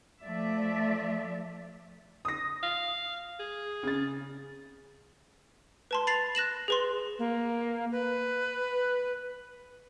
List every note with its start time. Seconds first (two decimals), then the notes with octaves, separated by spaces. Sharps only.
0.23 F3 A3 D5 E5
2.25 D#6 A#6
2.63 F5
3.40 G#4
3.83 C#3 A6
5.91 B4 A5 C6
6.07 B5 A6 C7 F7
6.35 F#6 A#6 E7 F#7
6.68 G#4 B4 C6
7.19 A#3
7.92 B4